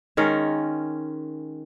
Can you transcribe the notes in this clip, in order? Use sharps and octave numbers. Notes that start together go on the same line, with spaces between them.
D#3 G#3 C#4 A#4